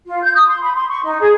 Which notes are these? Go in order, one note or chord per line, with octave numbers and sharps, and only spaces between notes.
F4
G6
D#6
C6
B5
C6
C#6
D#4
G#4